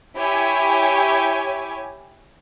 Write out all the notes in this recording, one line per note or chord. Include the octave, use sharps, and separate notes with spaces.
E4 G4 C#5 G#5